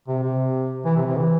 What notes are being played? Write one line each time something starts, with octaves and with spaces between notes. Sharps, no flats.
C3
C3
E3
C3
C3
E3